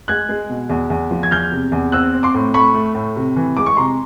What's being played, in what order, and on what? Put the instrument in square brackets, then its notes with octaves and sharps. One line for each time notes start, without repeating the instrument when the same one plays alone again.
[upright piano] G#3 F#6 G#6
G#3
B2
E2
E2
F3
G#6
E2 F6 G6
C3
E2
C4 E6 F#6
C4
C6 D6
A2
A3 B5 C#6
A3
A2
C3
E3
G#3 D6
C#6
C3 A#5 C6